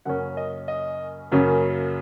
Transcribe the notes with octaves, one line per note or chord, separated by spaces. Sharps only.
F#2 C#3 A#3 C#4 F#5
D#5
D#5
F#2 C#3 F#3 A#3 C#4